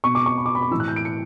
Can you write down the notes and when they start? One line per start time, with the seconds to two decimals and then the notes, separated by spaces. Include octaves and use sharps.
0.04 B2 C#6
0.15 D6
0.26 C#6
0.38 B5
0.46 D6
0.55 B5
0.62 D6
0.71 E3 E6
0.75 A2
0.80 F#6
0.88 G6
0.96 D7
1.05 C#7